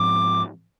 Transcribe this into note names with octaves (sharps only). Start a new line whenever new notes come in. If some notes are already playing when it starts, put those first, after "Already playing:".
Already playing: G#2 F3 C4 D6